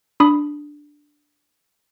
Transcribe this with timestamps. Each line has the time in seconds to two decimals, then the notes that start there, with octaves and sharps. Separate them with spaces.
0.20 D4 B5 D#6